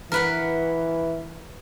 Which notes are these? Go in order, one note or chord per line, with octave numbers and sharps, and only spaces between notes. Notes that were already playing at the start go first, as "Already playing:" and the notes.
E3 A#4 B4 F#5